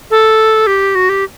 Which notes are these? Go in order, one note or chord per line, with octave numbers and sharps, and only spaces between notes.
A4
G4
F#4
G4